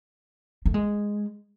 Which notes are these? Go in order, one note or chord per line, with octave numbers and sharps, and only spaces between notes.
A3
G#3